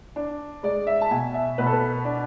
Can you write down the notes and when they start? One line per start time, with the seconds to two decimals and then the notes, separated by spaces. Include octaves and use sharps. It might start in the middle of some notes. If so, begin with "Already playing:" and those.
0.16 D4
0.63 G#3 D5
0.87 E5
1.01 A5
1.11 B2 G#5
1.34 E5
1.58 B2 B4
1.66 A4
1.73 B4
2.05 D4